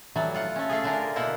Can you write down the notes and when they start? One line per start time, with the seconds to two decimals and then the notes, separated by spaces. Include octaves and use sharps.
0.16 E3 F#3 G3 A3 F#4
0.35 F4 F#5
0.56 A3 C#4
0.69 A3 F4 G#4
0.84 D3 D4 A#4
1.16 B2 A#3 E4 F#5